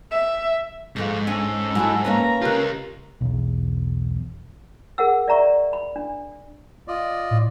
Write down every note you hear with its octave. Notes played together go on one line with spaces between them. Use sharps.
E5
G#2 F3 G#3 A3
C#4 A4 G#5
F#3 E4 F#4 G#5 A5
A#3 C#4 B4 A#5
C#3 F4 G4 A#4 F#6
B1 E2
G#4 A#4 F#5 E6
D5 E5 A#5 C#6
B5
D4
F4 D5 D#5
A2